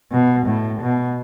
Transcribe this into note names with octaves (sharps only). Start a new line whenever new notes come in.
B2
A2
B2